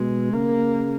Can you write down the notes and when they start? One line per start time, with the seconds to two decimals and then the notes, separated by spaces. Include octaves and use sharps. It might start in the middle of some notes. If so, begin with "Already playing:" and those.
Already playing: B2 G#3
0.33 C#3 A#3